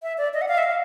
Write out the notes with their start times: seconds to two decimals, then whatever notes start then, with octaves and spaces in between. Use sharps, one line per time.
0.03 E5
0.18 D5
0.34 D#5
0.41 F#5
0.48 F5
0.58 E5
0.63 F5